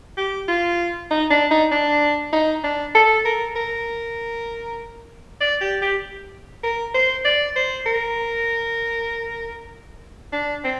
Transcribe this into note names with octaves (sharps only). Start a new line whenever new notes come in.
G4
F4
D#4
D4
D#4
D4
D#4
D4
A4
A#4
A#4
D5
G4
G4
A#4
C5
D5
C5
A#4
D4
C4